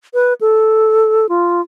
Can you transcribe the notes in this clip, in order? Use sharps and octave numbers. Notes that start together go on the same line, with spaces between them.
B4
A4
F4